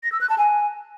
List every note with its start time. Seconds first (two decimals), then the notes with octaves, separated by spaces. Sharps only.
0.03 A#6
0.12 E6
0.21 F#6
0.29 A5
0.38 G#5